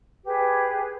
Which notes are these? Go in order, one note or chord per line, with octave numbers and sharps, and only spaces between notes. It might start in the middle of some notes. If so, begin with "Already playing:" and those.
G4 G#4 B4